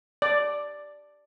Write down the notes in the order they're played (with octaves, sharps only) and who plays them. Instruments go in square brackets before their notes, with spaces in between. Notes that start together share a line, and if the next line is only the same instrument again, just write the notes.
[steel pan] D5